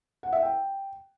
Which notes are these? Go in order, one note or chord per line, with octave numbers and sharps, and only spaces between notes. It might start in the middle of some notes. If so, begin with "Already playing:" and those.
F#5
E5
G5